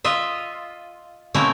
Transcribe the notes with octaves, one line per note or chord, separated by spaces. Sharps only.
F4 D#5 E5
B2 A3 A#3 C4 C#4 E4